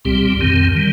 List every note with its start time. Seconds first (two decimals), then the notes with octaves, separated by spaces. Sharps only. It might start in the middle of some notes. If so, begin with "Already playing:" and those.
0.05 C2 A#2 G3 C4 G4
0.40 F2 D#3 C4
0.75 D#3 G3